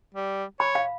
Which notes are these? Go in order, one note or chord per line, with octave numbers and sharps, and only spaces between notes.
G3
C#5 B5
F5